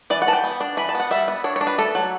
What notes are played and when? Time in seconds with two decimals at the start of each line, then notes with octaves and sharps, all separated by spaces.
0.10 E3 D5
0.22 F#5
0.27 E3 A5
0.33 G5
0.44 B3
0.61 D4
0.77 E3 B5
0.89 A5
0.95 B3 F#5
1.11 G3 E5
1.28 B3
1.44 D4 C#5
1.56 C#5
1.61 D4
1.67 B4
1.78 A3 A4
1.95 F#3